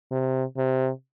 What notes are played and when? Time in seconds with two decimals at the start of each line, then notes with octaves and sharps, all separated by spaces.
0.12 C3
0.57 C3